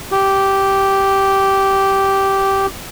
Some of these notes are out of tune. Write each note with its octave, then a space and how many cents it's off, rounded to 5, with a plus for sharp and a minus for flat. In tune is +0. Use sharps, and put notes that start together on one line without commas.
G4 -10